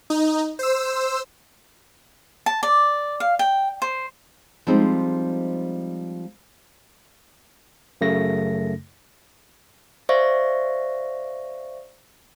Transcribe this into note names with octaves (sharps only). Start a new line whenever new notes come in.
D#4
C5 E6
A5
D5
F5
G5
C5
F3 G3 G#3 C4 D#4
F#2 C#3 A3 A#6
C5 D5 E5 F5 C#6 A#6